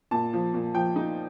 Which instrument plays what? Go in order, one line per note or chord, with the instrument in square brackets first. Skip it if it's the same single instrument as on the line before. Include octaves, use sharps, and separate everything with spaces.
[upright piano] A#2 A5
F3
A#2
F3 G5
D#4